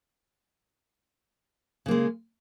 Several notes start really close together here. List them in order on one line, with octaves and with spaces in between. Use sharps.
C#3 A#3 G#3